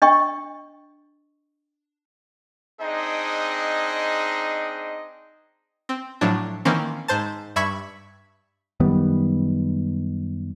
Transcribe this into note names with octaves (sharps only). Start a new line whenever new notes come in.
D4 D#5 G5 C#6
C4 D4 D#4 G#4 D#5
C4
A2 F3 F#3 D4
D#3 E3 A#3 C4 C#4
G#2 C5 A5
G2 E5 B5 C#6 G#6 B6
F#2 D#3 G3 B3